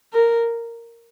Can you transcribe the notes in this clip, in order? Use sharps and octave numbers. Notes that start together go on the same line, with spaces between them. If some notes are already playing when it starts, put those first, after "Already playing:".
A#4